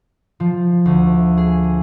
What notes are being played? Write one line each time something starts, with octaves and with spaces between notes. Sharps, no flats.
F3
D2
G#4